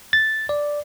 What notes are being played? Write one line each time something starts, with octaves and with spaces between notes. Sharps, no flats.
A6
D5